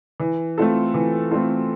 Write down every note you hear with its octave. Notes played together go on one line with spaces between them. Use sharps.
E3
A3 C4 F4 A4
E3
A3 C4 F4 A4